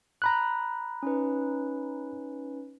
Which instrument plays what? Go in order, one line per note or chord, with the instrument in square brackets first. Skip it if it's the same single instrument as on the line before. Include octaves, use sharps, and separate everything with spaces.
[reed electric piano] A#5 B5 F#6
[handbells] C#4 D#4 B4